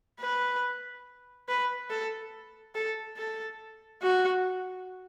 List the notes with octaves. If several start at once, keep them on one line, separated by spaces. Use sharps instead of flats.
B4
B4
A4
A4
A4
F#4